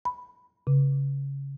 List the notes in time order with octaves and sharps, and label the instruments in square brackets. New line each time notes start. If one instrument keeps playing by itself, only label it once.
[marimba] B5
C#3